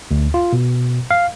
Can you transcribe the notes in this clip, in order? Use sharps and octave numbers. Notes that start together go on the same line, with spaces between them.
D2
F4
B2
F5